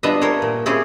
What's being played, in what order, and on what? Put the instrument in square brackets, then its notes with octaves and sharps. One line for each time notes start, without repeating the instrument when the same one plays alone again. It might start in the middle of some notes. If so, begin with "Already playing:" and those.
[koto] G3 B3 D4 F4 D#5 E5
A4 A#4 C5 C#5
A#2
C4 C#4 E4 G4 G#4